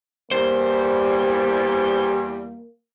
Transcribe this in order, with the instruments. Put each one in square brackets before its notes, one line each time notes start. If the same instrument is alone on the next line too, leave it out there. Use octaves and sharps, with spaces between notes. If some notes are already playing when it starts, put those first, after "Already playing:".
[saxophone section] E2 G3 [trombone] A#3 [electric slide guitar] C5